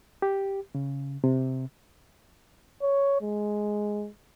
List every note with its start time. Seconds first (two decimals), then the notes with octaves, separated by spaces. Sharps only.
0.22 G4
0.75 C#3
1.24 C3
2.82 C#5
3.22 G#3